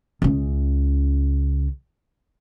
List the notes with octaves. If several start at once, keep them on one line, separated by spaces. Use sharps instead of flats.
C#2 C#3